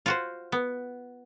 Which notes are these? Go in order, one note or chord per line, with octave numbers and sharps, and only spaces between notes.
F4 F#4 C5
B3